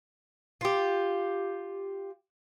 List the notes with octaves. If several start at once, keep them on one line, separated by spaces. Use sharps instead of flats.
F4 G4